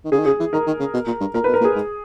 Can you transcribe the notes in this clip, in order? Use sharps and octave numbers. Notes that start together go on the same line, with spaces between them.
D#3
C#3 G#4
D#3
C#3 G#4
E3
D#3 A#4
D#3
C#3
B2
A#2
G2
A#2 A#4
B2 B4
A#4
A#2
G#4
G#2